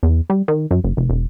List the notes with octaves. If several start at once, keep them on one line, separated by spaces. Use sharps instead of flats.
E2
G3
D#3
F#2
F#1
F1
E1